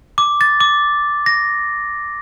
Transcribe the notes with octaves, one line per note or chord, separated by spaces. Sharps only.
D6
A6
D6
A#6